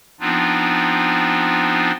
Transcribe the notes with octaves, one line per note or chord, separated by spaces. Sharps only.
F3 B3 C4 D4 D#4 F4